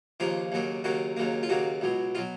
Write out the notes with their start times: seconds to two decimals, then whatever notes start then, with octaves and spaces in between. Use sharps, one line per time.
0.20 D#2 C#3 F3 A#3 F4
0.52 D#2 C#3 F#3 A#3
0.84 D#2 C#3 F#3 A#3 F#4
1.17 D#2 C#3 F#3 A#3
1.43 F4
1.49 D#2 C#3 F#3 A#3 F#4
1.81 C#2 B2 F#3
2.15 B2 F#3 F4